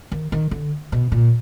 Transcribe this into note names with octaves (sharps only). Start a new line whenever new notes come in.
D#3
D#3
D3
B2
A#2